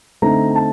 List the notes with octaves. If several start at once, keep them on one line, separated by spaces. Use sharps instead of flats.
D3 A3 C4 D#4 A#5
A#5
A5